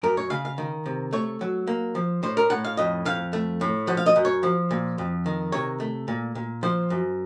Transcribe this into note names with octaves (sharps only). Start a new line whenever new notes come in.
F#2 A#4
C#5
C#3 F5
F5
D#3
C3
A3 C#5
F#3
A#3
F3
A2 C5
A#4
A2 F#5
F5
F2 D#5
F2 F5
A3
A2
F3 F#5
F5
D#5
F#2
C#5
F3
A#2
F2
D#3
C3 C#5
A3
A#2
A#2
F3 C5
F#2